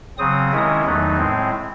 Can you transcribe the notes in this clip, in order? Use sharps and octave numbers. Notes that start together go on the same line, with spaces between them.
C#3 F#3 C4 D#6
C3 D#3 G#3 C#4 E4
E2 D#3 F#3 A3 D#4
A2 G#3 C4